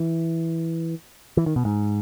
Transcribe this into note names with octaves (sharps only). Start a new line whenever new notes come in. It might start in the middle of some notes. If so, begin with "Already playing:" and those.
Already playing: E3
E3
D#3
B2
G#2